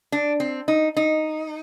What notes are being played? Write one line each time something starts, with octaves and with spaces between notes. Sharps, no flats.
D4
C4
D#4
D#4